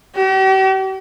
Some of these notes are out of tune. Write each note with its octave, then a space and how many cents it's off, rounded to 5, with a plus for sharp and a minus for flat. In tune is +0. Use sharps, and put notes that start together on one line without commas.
G4 -40